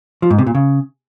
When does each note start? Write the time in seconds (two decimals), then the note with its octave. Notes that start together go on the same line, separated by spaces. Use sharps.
0.22 F3
0.30 G#2
0.38 C3
0.47 A#2
0.55 C#3